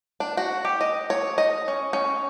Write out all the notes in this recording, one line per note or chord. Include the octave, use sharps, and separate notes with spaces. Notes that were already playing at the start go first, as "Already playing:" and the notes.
D4
F#4
G4
D#5
C#5
D#5
C#4
C#4